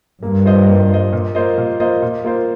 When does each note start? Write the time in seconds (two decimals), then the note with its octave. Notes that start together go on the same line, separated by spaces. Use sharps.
0.23 G2 A#3
0.45 F4 C5 D#5
0.68 A#3
0.90 F4 C5 D#5
1.13 A#2
1.35 A#3 F4 C5 D#5
1.58 A#2
1.80 A#3 F4 C5 D#5
2.02 A#2
2.24 A#3 F4 C5